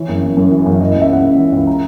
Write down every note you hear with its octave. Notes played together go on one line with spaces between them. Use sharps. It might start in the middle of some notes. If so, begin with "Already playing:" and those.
Already playing: E3 C#5
F#1
F#1
F#2
E3
F#1
E3 D#5
C#2 D#5
E5
C#2 F#5
C#3
E3
C#2
A#5